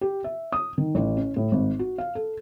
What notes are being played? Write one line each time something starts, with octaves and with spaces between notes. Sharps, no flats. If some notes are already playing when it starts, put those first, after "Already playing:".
G4
E5
D#6
D#3
A1
C#4
A2
G#1
F#4
F5
A4